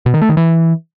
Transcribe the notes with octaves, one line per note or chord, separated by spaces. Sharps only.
B2
D#3
A3
D#3
E3